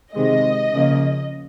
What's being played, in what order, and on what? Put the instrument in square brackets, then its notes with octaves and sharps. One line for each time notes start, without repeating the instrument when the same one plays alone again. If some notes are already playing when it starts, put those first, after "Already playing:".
[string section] C3 D#3 G#3 D#5
C#3 F3 A#3